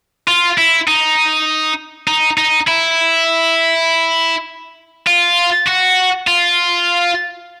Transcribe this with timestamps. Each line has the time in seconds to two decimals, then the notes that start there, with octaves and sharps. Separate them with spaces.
0.28 F4
0.58 E4
0.88 D#4
2.08 D#4
2.38 D#4
2.67 E4
5.07 F4
5.67 F#4
6.27 F4